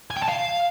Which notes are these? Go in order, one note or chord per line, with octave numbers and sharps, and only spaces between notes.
G#5
G5
A5
F5